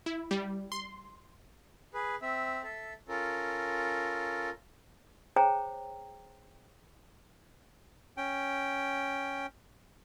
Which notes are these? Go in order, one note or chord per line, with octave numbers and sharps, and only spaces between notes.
E4
G3
C6
G#4 B4
C4 E5
A4 E5
C#4 F4 A4 A#4
G#4 C5 C#5 G5 A#5
C#4 G5